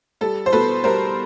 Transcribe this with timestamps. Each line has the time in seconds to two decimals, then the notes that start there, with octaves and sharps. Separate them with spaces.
0.21 G3 A4
0.46 C5
0.53 B2 A4 B4
0.84 G3 A#4 C5